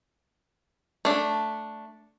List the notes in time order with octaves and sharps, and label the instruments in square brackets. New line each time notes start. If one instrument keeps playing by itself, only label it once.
[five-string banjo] A3 D4